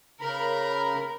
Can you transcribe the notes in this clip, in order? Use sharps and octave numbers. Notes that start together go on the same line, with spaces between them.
C#3 A#4 A#5 B5